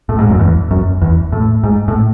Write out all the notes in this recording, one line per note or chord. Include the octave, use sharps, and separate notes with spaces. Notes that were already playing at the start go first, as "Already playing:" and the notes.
A2
G#2
F#2
E2
F#2
E2
A2
G#2
A2